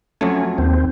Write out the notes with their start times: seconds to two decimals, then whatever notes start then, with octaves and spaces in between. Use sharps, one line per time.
0.21 F2 F#3 A3 C#4
0.58 D#2 C4